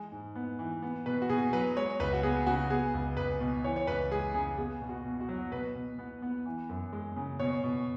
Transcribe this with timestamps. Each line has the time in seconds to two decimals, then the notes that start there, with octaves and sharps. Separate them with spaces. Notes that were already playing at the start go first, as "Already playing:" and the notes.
Already playing: E3 G#3
0.12 G#2
0.35 B3
0.59 E3
0.82 B3
1.06 B2 B4
1.22 F#4
1.29 B2 G#4
1.53 F#3 B4
1.76 G#3 C#5
2.00 C#2 B4
2.13 F#4
2.23 B3 G#4
2.47 C#3 F#4
2.70 B3 G#4
2.94 C#2
3.17 C#2 B4
3.40 B2
3.64 E3 C#5
3.76 C#5
3.87 C#2 B4
4.11 G#3 G#4
4.34 C#3 G#4
4.58 B3 G#4
4.82 B2
4.89 F#4
5.05 B2
5.21 F#4
5.29 F#3
5.52 B2 B4
5.75 B2
5.99 B3
6.22 B3
6.46 E3
6.69 F#2
6.93 G#3
7.16 C#3
7.39 B2 C#5
7.64 B2